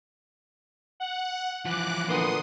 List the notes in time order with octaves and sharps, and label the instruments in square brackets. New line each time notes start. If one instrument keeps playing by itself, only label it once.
[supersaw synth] F#5
[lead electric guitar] E3 F3 [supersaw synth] D6 F#6
[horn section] A#2 D3 B3 [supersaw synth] C6 D#6